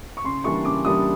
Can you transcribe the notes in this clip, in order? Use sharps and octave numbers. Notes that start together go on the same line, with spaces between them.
C#6
C#3 C6
E3 G3 A#3 D4 C#6
C#3 D6
E3 G3 A#3 D4 D#6